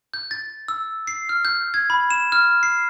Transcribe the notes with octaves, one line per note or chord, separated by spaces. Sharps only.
G6
A6
E6
C7
F6
G6
G#6
B5
E7
F6
C7